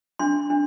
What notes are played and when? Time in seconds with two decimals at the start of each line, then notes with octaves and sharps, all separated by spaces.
0.19 D4 C6
0.50 D4